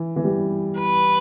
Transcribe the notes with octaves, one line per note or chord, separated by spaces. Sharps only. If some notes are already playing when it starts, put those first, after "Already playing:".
Already playing: E3
E3
G3
B4